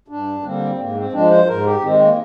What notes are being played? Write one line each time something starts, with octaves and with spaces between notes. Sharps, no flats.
G2 D4
D3 G3 A#3 C4
G#2 A#3
C4
F3 G#3 D4
C5
G#2 A#4
G4
D#3 G#3 C4
A#3